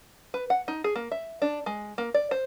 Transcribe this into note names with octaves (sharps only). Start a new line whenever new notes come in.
B4
F#5
D#4
G#4
A#3
E5
D4
G#3
A#3
D5
C5